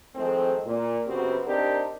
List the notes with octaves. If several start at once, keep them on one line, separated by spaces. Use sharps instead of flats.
D#3 F3 G#3 A3 C4
A#2
F#2 C#3 B3 C4 F#4 G4
C4 D4 D#4 G4 A#4